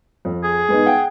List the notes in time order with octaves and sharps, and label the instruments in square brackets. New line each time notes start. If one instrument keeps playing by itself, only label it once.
[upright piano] F2
[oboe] G#4
[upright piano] G#3 B3 D#4
F#5 G5